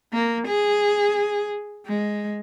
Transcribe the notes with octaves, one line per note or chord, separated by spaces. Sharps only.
A#3
G#4
G#3